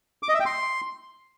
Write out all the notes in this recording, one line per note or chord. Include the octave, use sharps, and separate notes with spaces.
D6
D#5
E5
G5
C6